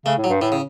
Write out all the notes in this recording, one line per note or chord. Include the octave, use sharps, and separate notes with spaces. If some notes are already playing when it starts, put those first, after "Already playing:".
C#3 A3
A2
F#3
G2
A2 E3
C#3